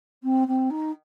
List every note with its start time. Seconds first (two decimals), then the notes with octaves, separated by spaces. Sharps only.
0.23 C4
0.47 C4
0.70 D#4